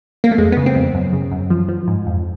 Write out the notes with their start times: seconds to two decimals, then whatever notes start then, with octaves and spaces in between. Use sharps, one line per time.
0.24 A#3
0.31 A3
0.38 F2 G#3
0.52 C#3 B3
0.66 C4
0.75 F2
0.95 F#2
1.13 C#3
1.32 F#2
1.50 F3
1.68 F3
1.88 G#2
2.07 F2